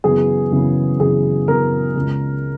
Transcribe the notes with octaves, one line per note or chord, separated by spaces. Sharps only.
F#2 C#3 E3 B3 G#4
F#2 C#3 E3 B3
F#2 C#3 E3 B3 G#4
F#2 C#3 E3 B3 A#4
C#2 C#3 G#3